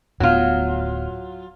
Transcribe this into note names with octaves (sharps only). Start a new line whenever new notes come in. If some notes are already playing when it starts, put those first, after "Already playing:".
D1 A2 F#3 B3 F4